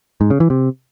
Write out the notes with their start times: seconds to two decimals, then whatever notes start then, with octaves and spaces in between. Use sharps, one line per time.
0.21 G#2
0.30 C#3
0.40 E3
0.50 C3